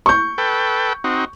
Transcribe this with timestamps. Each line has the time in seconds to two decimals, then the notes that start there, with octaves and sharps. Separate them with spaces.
0.06 C#6 G6
0.38 A4 B4 G5
1.04 C4 D#4 F#4